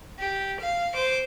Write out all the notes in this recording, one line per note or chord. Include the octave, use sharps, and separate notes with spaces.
G4
F5
C5 D6